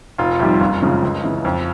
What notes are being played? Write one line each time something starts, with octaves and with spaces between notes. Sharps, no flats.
F1 F4
F2 C3 D#3 G3 F4
F#1 F4
F#2 C#3 F3 G#3
C#2
C#3 E3
F2